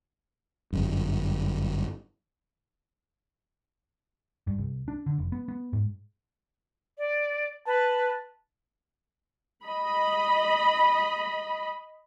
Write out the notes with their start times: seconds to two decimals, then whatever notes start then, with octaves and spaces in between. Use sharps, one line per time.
0.73 G1 F#2
4.47 G2
4.58 C2
4.88 D4
5.06 D3
5.18 F1
5.32 B3
5.48 B3
5.73 G#2
6.98 D5
7.67 B4 A5
9.65 D#5 B5